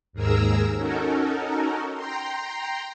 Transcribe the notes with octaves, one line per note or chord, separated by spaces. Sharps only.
D#2 G#2 G#4 A#4 A#5 E6
C#4 D#4 F#4 A4 A#4
G5 A#5 C6